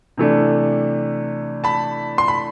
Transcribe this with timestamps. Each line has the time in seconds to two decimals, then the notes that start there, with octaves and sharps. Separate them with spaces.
0.17 C3 E3 A3 D4
1.64 A5 B5
2.18 C6
2.28 B5